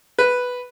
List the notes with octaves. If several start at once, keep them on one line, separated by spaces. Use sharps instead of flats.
B4